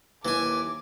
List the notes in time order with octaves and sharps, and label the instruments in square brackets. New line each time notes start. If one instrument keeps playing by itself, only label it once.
[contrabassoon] D#2 [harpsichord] E3 G#5 [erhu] D6